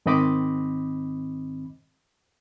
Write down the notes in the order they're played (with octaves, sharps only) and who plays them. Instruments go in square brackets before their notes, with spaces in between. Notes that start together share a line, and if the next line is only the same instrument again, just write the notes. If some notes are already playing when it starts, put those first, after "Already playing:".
[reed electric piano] G#2 D#3 C4 D#5 B5 D6